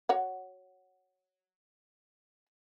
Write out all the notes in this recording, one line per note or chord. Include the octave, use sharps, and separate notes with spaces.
F#4 C#5 F#5